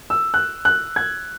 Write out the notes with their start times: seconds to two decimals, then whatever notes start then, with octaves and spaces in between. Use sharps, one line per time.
0.10 E6
0.34 F#6
0.65 F#6
0.96 G#6